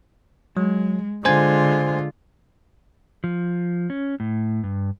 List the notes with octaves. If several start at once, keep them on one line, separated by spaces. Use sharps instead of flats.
F#3 G#3
D3 G#3 F4 C5 G#5 G#6
F3
C#4
A2
G2